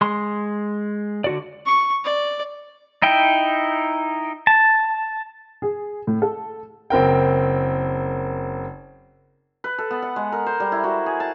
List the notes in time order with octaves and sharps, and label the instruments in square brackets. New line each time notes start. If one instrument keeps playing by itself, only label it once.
[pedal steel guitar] G#3 C6
D3 F#4 D5
[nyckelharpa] C#6
D5
[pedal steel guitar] D#4 E4 G5
A5
[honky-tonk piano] G#4
A2
A4
[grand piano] F#1 C4 A#4 G5
[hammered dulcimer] B4
A4
B3
F#5
G#3
A#4
C5
G3
E4
F#4
G#4
A5